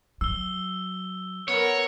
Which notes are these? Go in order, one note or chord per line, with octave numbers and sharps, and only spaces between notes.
F#3 E6 G7
B3 A#4 C#5